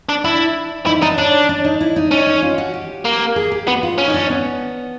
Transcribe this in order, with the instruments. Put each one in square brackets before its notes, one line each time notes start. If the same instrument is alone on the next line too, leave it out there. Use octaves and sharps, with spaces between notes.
[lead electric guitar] D4
[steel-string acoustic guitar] D4 [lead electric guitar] E4
[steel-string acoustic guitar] D#4 [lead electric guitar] E4
[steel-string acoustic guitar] D4 [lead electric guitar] D#4
[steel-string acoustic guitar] C#4 [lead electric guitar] D4
[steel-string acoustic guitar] D4
D#4
E4
D#4
[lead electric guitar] C#4 [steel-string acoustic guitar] D4
[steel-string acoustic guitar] D#4
F4
F#4
G4
[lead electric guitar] A#3
[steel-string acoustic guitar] G#4
G4
[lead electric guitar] B3 [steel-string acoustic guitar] F#4
[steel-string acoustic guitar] F4
[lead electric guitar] C#4
[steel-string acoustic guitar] D#4
D4
B3